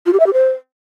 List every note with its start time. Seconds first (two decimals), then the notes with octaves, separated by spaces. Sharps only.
0.06 F4
0.13 G4
0.20 E5
0.27 G4
0.33 C5